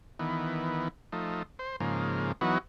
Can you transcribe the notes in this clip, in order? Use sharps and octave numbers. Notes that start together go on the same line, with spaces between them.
D#3 E3 B3
F3 A3 D#4
C5
G#2 C#3 F3 A#3
E3 F#3 B3 D#4 F#4